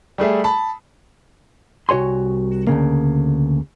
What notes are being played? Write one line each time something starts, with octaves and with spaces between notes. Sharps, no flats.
G3 A3 G#4 E5
A5 B5
C2 F#4 C#5 G#5 C6
D2 G2 C#3 A#3